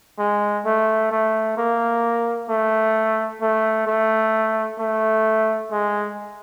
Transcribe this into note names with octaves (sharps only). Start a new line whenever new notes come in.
G#3
A3
A3
A#3
A3
A3
A3
A3
G#3